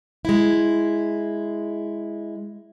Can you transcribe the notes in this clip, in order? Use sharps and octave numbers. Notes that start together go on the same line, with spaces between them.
G#3 E4